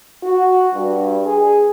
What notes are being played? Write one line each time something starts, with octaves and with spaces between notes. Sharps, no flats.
F#4
G2
G#4